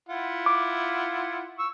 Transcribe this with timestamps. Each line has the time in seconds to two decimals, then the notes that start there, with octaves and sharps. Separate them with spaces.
0.09 E4 F4 F#5
0.46 D6
1.59 C#6 E6